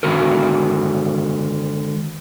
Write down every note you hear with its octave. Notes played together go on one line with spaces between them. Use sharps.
D3 D#3 G#3 F#4 A#4